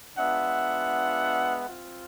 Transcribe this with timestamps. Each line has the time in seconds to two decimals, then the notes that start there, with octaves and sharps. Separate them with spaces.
0.18 G#3 B3 D4 F4 E5 F#5
1.68 C4 F4